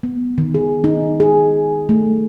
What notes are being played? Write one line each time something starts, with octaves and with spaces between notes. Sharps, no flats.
B3
D#3
G#4
D#4
G#4
A3